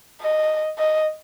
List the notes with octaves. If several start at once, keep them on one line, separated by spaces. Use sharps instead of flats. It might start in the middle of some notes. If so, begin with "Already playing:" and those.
D#5
D#5